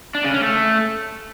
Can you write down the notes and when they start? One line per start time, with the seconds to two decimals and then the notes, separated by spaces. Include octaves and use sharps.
0.15 D4
0.24 C#3
0.34 C#4
0.43 A3